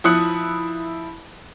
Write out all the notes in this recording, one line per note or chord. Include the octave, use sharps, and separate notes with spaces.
F3 E4 D#6 F#6 C#7